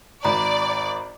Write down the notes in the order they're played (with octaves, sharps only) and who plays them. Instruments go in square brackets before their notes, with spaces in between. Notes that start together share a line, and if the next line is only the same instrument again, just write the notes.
[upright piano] G#1 [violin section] D5 [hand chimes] A#5 B5